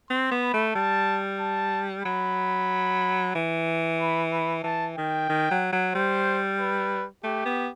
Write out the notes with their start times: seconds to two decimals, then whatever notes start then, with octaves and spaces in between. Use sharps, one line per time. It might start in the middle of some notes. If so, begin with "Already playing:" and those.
0.10 C4 C6
0.31 B3
0.42 B5
0.54 A3
0.75 G3 A5
1.40 A5
2.04 F#3 B5
3.35 E3
4.00 B5
4.32 B5
4.64 E3 A5
4.96 D#3 G5
5.29 D#3
5.51 F#3
5.72 F#3
5.94 G3 C5
6.59 B4
7.24 A3 G4
7.46 B3